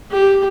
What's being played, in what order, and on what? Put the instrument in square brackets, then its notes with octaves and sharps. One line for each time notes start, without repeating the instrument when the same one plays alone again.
[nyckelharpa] G4